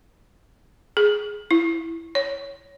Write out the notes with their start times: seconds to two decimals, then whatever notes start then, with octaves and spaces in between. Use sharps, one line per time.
0.97 G#4
1.51 E4
2.15 C#5